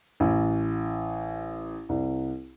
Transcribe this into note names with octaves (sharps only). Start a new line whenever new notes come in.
A1
C2